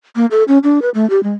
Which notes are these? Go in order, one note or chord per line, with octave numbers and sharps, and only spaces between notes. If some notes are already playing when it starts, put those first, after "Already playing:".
A#3
A4
C#4
D4
B4
A3
G4
G#3